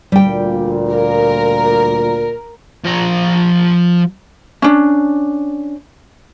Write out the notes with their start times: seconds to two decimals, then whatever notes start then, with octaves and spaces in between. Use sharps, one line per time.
0.12 D2 A#2 G3 G5
0.93 A#4
2.84 F3 A#5
4.62 C#4 D4